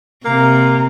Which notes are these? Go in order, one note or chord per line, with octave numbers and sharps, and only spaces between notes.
C3 A#3 A#5